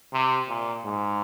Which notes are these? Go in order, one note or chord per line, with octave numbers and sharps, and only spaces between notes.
C3
A#2
G#2